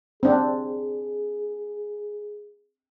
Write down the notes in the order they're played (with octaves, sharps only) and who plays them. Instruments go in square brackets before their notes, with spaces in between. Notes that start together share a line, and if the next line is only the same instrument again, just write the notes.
[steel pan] C4 D4 [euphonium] G#4